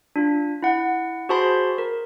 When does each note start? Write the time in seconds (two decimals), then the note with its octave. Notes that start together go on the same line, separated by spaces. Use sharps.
0.16 D4 F4
0.63 E4 F#5
1.29 F#4 G#4 C5 A5 B5 C6
1.78 A#4